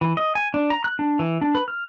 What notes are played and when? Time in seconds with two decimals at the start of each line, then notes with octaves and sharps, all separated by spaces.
0.01 E3
0.17 D#5
0.35 G#5
0.54 D4
0.70 A#5
0.84 F#6
0.99 D4
1.19 E3
1.41 D4
1.55 B4
1.68 F6